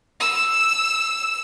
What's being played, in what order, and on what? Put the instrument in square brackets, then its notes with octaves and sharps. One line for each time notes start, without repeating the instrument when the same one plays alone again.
[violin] E6